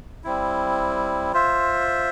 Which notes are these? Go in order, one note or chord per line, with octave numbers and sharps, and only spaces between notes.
G3 C4 E4
F4 C5 E5